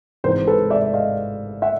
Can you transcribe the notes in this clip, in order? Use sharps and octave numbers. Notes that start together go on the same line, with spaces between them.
G#1 G#2 E3 A#4 C5
A4 B4
D5 E5
D#5 F5
E5 F#5